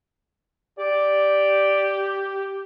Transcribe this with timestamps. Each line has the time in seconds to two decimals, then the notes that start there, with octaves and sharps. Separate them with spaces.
0.79 G4 D5